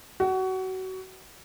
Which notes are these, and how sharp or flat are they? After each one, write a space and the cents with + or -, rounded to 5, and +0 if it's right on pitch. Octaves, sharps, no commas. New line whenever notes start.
F#4 +25